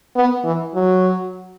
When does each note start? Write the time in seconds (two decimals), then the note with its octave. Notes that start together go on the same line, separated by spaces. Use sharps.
0.16 B3
0.45 E3
0.75 F#3